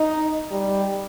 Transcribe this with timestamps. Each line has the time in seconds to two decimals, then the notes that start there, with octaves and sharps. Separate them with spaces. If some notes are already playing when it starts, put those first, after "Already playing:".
Already playing: D#4
0.51 G3